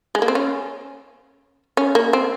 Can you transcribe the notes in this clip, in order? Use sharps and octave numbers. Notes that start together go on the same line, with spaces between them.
G#3
A#3
C4
C#4
C#4
A#3
C4